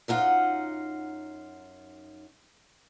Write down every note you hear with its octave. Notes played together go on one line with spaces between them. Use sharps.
F#2 D#4 F4 F#5